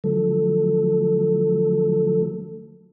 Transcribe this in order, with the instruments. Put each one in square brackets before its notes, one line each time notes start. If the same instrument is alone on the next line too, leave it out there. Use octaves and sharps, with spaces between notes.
[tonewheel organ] D3 F3 F#3 A3 A4